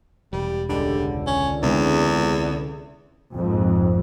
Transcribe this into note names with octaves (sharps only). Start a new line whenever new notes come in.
E1 G3
C#2 D3 G3
C#4
E2 C3 G#3
A#1 F2 G#2